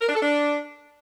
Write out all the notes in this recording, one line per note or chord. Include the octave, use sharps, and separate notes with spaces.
A#4
D4
A4
D4